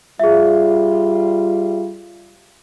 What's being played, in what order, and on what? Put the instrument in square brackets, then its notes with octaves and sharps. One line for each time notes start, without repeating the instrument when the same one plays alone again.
[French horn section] G3 F4 [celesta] G#4 E5